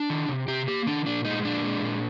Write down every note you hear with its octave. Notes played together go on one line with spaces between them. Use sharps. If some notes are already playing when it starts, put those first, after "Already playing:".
Already playing: D4
D#3
C3
C3 G4
A#3 G4
D#3 D4
A#2 D4
G#3 D#4
A#2 D4
G#3
A#2